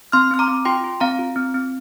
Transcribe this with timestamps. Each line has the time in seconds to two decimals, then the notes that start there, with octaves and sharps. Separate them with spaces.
0.12 C4 C6 F6
0.31 C4 F6
0.39 A#5 D6
0.48 C4
0.65 F4 G5 C6
0.84 F4
1.00 C4 F5 A#5
1.19 F4
1.36 C4
1.54 C4